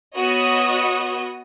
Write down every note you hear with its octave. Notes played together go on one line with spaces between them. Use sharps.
B3 F#4 C#5 D#5 D#6